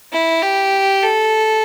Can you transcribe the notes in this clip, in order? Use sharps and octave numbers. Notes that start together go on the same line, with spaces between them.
E4
G4
A4